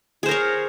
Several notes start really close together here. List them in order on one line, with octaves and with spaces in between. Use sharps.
G#4 C5 A#4 C#5